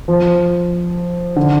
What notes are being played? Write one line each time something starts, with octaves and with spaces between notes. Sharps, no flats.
F3
D3